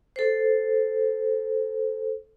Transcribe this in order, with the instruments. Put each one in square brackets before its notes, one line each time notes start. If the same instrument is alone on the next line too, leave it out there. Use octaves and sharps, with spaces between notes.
[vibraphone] A4 C5